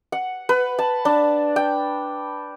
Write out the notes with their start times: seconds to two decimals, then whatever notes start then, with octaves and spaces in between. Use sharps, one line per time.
0.12 F#5
0.49 B4
0.79 A5
1.05 D4
1.56 G5